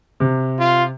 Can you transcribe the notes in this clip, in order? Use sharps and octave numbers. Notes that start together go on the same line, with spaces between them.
C3
F4